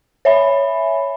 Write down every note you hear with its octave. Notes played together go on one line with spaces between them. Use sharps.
C#5 E5 G#5 B5